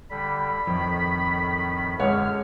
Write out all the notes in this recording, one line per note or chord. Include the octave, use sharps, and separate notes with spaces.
D3 G3 B5
F2 A2 D#3
F#2 D3 G#3 C#5 F#5 F6